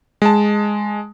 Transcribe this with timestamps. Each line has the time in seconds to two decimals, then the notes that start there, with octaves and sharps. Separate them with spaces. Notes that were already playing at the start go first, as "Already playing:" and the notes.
0.22 G#3 A5